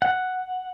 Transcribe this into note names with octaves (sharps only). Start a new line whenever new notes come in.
F#5